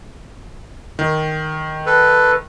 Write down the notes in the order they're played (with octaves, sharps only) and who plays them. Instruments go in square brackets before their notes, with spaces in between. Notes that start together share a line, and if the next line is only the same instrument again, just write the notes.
[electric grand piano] D#3
[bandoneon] A4 B4